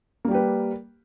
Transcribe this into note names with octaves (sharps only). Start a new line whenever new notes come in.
G3 A#3 G4 B4